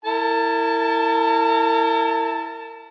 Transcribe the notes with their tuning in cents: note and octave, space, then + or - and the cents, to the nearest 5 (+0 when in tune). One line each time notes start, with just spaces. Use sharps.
E4 +0 A#4 -35 A5 +0